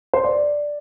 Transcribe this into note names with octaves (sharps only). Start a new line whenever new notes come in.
C5
D5